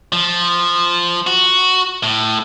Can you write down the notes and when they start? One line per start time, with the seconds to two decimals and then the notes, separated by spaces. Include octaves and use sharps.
0.13 F3
1.27 F#4
2.03 A2